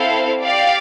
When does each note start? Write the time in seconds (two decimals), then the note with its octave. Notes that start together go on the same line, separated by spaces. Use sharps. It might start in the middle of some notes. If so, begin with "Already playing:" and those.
Already playing: C4 E4 A4 C5 F5
0.41 G4 D5 F5